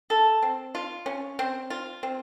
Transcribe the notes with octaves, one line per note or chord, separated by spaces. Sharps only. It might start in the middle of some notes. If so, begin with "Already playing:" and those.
A4
C4
F4
C#4
C4
F4
C4